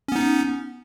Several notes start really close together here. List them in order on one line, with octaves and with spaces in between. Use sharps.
C#4 B3 D#4